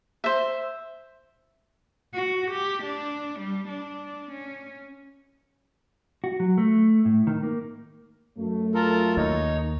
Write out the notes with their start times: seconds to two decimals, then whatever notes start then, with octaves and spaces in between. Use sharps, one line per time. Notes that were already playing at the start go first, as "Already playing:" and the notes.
0.24 C5 E5
2.15 F#4
2.51 G4
2.83 D4
3.40 G3
3.68 D4
4.32 C#4
6.24 F#4
6.40 F#3
6.58 A3
7.05 A2
7.27 D#3
7.43 A#3
8.38 F#2 A3
8.75 F4 A4 A#4
9.17 D#2 D#4 C#5